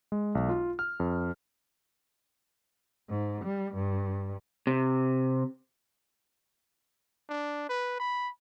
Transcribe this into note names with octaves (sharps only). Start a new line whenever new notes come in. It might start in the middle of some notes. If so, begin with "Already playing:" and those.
G#3
B1
F4
F6
F2
G#2
G3
G2
C3
D4
B4
B5